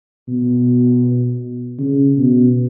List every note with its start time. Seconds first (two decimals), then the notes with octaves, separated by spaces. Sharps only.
0.28 B2
1.79 C#3
2.17 B2